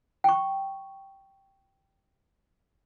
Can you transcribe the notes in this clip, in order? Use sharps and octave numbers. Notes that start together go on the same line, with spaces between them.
G5 C#6